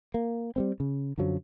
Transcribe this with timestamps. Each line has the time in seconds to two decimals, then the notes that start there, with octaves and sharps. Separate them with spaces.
0.14 A#3
0.56 G3 A3 C4
0.80 C#3
1.18 F#2 D3 F3 F#3